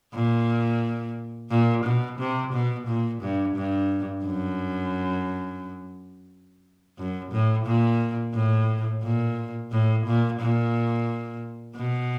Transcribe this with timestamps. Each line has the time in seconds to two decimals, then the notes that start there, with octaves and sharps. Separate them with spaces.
0.14 A#2
1.50 A#2
1.85 B2
2.19 C3
2.53 B2
2.87 A#2
3.22 G2
3.56 G2
4.25 F#2
6.98 F#2
7.32 A2
7.66 A#2
8.34 A2
9.03 A#2
9.72 A2
10.06 A#2
10.41 A#2
11.77 B2